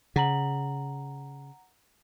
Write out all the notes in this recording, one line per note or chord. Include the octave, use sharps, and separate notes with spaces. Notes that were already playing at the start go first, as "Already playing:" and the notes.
C#3 F#5 A#5 F#7